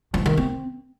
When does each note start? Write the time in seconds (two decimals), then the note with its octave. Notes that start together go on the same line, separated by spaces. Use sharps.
0.14 F3
0.26 D#3
0.37 C4